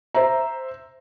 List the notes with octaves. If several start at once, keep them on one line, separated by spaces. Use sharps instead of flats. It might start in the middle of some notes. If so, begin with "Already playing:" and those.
C5 E5 A#5